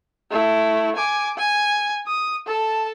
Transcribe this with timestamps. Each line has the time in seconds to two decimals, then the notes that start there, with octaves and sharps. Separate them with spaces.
0.31 A3 E4
0.96 G#5 D6
1.38 G#5
2.07 D#6
2.47 A4 A5